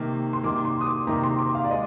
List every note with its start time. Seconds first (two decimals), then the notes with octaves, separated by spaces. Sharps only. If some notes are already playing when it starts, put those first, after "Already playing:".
Already playing: C3 D#3 A#3
0.33 C6
0.43 C3 D#3 A#3 D6
0.65 C6
0.81 D#6
0.87 D6
1.07 C3 D#3 A#3 A#5
1.24 C6
1.39 D6
1.55 F5
1.64 D5
1.71 G#3 D#5